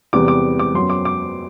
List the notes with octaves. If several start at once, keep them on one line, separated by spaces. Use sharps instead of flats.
E2 C3 G3 B3 D6
D6
D6
F#2 F#3 B3 C6
D6
D6